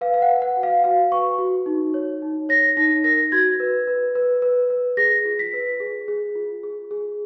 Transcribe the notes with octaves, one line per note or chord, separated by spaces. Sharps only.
B4 F5
F5
F#5
B4
F#5
F#4
F5
F#4 F5
B4 C#6
F#4
D#4
C#5
D#4
C#5 A#6
D#4 A#6
A#4 A#6
F#4 G#6
B4
B4
B4
B4
B4
G#4 A#6
F4
B6
B4
G#4
G#4
F4
G#4
G#4